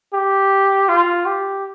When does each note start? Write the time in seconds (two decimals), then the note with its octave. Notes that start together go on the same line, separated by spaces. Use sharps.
0.13 G4
0.88 F4
1.25 G4